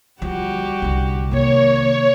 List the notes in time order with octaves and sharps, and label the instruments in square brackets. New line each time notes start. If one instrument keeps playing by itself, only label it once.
[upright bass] D2 F3 [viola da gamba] G3 F#4 G4
[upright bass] C2 D3
[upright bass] C3 D#3 [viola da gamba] A#3 [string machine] C#5